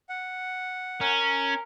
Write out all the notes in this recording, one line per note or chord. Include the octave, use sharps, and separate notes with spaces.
F#5
C#4 A#4